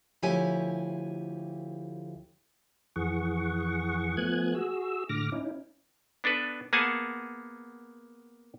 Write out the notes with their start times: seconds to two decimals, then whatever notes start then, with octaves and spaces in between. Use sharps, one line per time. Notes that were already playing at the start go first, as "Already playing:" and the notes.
0.22 D2 F3 E4 G4 C#5 G#5
2.96 F2 E3 G#4 F#5 C#6
4.17 F3 A3 B3 G#5 F#6 G#6
4.55 F#4 G#4 E6
5.09 A2 D3 D6 F6 A#6
5.32 C#4 D#4 E4
6.24 B3 D4 A4 B4
6.73 A#3 B3 G#4 F#5 G#5 A5